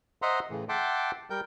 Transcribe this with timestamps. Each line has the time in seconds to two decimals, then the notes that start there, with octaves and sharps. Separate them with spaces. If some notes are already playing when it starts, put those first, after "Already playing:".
0.22 C5 D#5 E5 F#5 A#5 C6
0.50 A2 C#3 E3
0.69 E5 F#5 G5 A5 C6 D6
1.30 G3 A#4 G5 G6